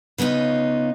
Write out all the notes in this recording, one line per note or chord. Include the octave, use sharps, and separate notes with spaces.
C#3 B3 C#4 D#4 F4